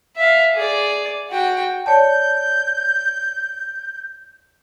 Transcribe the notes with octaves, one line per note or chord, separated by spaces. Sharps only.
E5 F5
G#4 D5
F#4 G5
C#5 D5 A5 G6